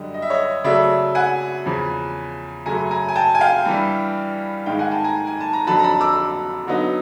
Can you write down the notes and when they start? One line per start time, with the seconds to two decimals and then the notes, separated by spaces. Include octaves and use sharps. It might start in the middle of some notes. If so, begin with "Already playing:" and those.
Already playing: F#2 D3 G3 D#5
0.14 D#5
0.22 E5
0.30 C#5 D#5
0.64 C#3 F#3 A3 D5 E5
1.15 F#5 G#5
1.66 E2 C#3 F3
2.66 F#2 C#3 F#3 A3 G#5 A#5
2.91 G#5 A#5
3.09 G#5
3.16 G5 A5
3.35 G#5
3.41 F5 G5
3.66 G2 E3 G3
4.66 G#2 D#3 G#3 F5 G5
4.79 F#5 G#5
4.92 G5 A5
5.04 G#5 A#5
5.27 G#5
5.41 A5
5.53 A#5
5.67 F2 D3 F#3 A5 B5
5.79 A#5
5.84 A5 B5
6.01 D6 E6
6.67 D3 F#3 B3 D#4